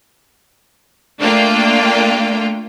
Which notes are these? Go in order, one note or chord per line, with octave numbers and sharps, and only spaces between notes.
A3 A#3 D4 F4 G5